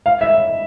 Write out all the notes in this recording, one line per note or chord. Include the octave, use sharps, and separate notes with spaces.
F5
E5